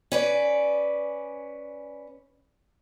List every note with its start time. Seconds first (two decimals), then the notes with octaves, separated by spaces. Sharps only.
0.12 C#4 B4 D5